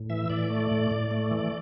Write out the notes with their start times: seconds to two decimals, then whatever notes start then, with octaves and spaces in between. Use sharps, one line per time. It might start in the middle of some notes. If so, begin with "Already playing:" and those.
Already playing: A2
0.10 E3 E5
0.30 A2 D5
0.50 A3
0.71 A2
0.91 A2
1.11 A3
1.31 E3